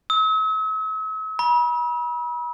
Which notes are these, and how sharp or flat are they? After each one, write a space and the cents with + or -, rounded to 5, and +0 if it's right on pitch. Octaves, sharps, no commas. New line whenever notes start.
E6 -45
B5 -40